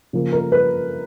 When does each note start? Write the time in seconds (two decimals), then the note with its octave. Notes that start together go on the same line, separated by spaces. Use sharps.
0.13 C#3 F3 A#3
0.33 A#4
0.52 B4